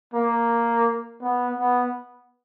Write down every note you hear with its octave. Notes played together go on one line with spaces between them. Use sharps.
A#3
B3
B3